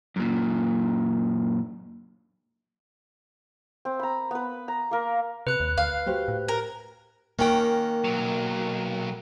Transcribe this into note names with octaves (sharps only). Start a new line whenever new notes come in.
F#2 A#2
C4
A#5 B5
B3 B4
A#5
A#3 A#4
C3 B4 F#6
D#2
D2 F5
F#4 G4 C5
A2
A#4
D#3 A#3 C#4 F#5 G5
B1 F#3